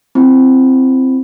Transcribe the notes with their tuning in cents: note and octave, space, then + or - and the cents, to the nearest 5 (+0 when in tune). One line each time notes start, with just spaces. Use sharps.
C4 +0 E4 +35 B5 +0